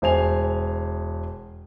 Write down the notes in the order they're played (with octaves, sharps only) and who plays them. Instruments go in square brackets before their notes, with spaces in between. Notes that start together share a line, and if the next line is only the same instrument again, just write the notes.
[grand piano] E1 C5 G#5 F7